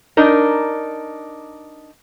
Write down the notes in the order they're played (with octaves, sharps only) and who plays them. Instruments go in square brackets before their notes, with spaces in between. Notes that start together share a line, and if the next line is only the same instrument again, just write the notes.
[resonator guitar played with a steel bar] D4 D#4 A#4